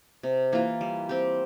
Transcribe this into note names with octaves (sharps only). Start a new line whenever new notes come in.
C3
E3 A#3 F4
G3
C4 G4